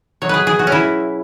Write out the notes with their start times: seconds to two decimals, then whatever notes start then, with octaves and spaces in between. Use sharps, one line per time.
0.22 B2 F#3 C#5
0.29 G#4 B4
0.47 G#4
0.59 F#4
0.67 C#4
0.72 E4